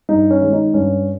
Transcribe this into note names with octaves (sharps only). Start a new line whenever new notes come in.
G2 D#4
C#4
D#3 G#3
D#4
G2 C#4